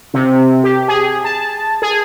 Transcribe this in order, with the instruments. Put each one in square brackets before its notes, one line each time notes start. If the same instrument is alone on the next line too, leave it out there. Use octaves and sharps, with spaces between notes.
[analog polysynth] C3
G4
G#4
A5
G#4